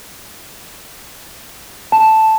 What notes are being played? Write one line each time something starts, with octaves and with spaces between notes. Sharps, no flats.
A5